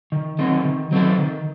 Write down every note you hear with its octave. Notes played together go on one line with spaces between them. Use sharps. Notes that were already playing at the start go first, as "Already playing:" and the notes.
D#3
F#3 C4 D#4 A4
D#3
F#3 C4 D#4 A4
D#3